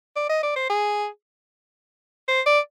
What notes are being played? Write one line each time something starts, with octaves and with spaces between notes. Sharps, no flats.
D5
D#5
D5
C5
G#4
C5
D5